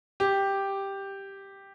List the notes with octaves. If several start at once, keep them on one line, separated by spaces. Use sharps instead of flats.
G4